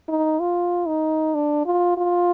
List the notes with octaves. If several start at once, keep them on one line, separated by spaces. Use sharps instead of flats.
D#4
F4
D#4
D4
F4
F4